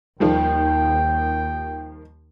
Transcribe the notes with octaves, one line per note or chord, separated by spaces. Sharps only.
D#2 D#3 F3 G3 G5